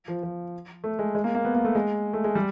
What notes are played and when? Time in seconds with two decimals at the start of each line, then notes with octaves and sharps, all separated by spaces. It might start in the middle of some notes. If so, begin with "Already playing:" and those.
0.08 F3
0.23 F3
0.84 A3
0.99 G#3
1.15 G#3
1.24 A#3
1.35 A#3
1.45 B3
1.55 A#3
1.65 A3
1.75 G#3
2.13 A3
2.24 G#3
2.35 G3